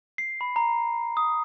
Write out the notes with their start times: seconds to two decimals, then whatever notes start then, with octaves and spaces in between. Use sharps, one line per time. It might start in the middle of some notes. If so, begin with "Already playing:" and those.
0.18 C7
0.41 B5
0.56 A#5
1.17 D#6